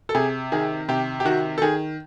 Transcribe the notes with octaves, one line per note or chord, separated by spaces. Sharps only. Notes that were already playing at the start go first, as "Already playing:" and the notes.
A4
C3 G#4
D#3 G#4
C3 G4
G4
D#3 F#4
A4
D#3 G#4